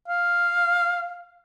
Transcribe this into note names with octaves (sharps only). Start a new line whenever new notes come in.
F5